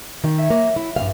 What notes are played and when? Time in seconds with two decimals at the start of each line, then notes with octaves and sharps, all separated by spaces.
0.24 D#3
0.38 C#5 E5
0.50 F#3 A#3
0.76 E4
0.96 A#1 G2 F5